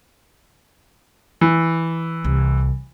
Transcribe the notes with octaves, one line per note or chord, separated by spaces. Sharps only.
E3
C2